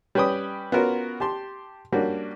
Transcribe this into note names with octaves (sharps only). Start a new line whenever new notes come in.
G3 C#4 B4 G5 B5 D#6
B3 C#4 F4 F#4 A#4
G4 A5 C6
G3 A#3 C#4 D4 F#4